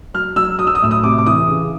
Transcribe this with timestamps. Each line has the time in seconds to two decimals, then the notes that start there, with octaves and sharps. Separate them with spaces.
0.14 F#3 F6
0.36 F#3 E6
0.58 F#3 D#6
0.67 E6
0.75 D#6
0.82 A2 E6
0.91 D#6
1.04 C3 D6
1.18 D6
1.26 E3 D#6
1.49 C#3